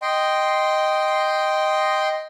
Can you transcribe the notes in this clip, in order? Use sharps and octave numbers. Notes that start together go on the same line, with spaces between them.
D#5 G5 C6